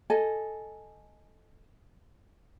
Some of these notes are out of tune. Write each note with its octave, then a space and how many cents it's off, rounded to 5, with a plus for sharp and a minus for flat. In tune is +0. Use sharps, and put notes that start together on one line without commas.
A4 -5 D#5 +0 G#5 +0